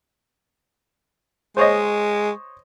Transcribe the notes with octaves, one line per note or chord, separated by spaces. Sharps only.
G#3 C5 C#5 D#5